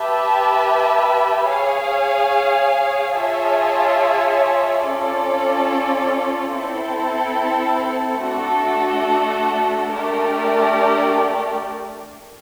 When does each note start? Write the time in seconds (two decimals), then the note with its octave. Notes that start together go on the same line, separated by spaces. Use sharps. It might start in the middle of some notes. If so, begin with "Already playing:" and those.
Already playing: G4 B4 E5 A5
1.46 G#4 C#5 F5 G#5
3.16 F4 G#4 C#5 E5 A5
4.84 C#4 F4 A4 D5
6.54 C4 E4 A4
8.23 A3 D4 F#4 A4
9.92 A3 D4 G4 A#4 D5